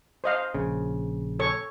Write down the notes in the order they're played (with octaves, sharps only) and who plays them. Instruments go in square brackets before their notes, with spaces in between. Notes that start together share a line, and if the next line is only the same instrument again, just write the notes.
[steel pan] C5 D#5 F5
[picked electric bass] A#1 C#3
[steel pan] A4 C#5 C#6